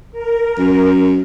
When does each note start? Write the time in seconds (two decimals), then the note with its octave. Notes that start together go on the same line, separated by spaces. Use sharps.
0.12 A#4
0.58 F#2